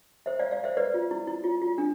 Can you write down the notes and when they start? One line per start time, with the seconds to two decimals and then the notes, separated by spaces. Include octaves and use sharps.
0.26 C5 E5
0.39 D5 F5
0.51 D5 F5
0.64 C5 E5
0.77 B4 D5
0.94 F4
1.11 E4
1.27 E4
1.44 F4
1.62 F4
1.78 D4